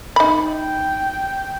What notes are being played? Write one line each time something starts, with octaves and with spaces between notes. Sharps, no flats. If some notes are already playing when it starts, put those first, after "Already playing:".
D#4 B5
G5